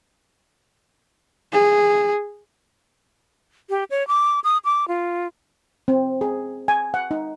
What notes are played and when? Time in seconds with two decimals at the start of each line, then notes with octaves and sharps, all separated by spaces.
1.53 G#4
3.70 G4
3.90 C#5
4.08 D6
4.44 D#6
4.65 D6
4.88 F4
5.88 C4
6.21 G#4
6.68 G#5
6.94 F#5
7.11 D#4